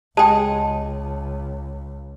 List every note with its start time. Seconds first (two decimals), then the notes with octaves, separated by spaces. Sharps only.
0.17 C#2 G#3 G#4 D#5 G5 A5